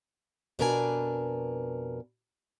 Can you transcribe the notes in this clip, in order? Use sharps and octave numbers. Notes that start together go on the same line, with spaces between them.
F2 B2 D4 A#4 B4 G#5